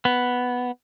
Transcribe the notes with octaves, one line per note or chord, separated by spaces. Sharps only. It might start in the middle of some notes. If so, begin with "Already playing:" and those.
B3